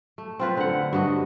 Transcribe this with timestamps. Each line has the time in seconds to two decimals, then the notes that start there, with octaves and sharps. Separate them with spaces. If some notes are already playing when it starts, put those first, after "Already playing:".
0.18 A3
0.40 C4 F4 B4
0.57 D3 F#5
0.93 G2 F#4 D#5